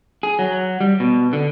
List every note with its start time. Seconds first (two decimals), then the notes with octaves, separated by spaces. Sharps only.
0.23 G#4
0.39 F#3
0.81 G3
1.00 B2
1.33 D3